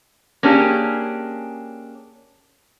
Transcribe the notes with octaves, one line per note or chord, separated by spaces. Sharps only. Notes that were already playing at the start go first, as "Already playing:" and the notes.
A#3 C#4 D4 G4 G#4